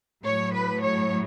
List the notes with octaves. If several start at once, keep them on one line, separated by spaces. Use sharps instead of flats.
A2 F#3 C#5
B4
C#5